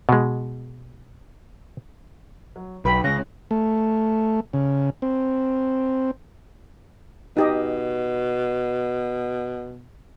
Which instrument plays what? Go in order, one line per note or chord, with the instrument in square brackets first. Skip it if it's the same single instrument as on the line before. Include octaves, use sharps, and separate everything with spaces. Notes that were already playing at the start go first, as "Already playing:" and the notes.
[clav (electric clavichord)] B2 G#3
[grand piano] F#3
[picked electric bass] B1 [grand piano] B4 G5 [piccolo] B5
[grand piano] C#2 C#4 F#6 [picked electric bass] C#3 [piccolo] A#6
[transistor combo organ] A3
C#3
C4
[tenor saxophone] B2 [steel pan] D#4 G4 D#5